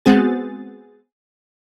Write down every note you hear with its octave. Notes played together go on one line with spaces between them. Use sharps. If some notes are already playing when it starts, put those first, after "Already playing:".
G#3 B3 C4 F#4 G#4 A6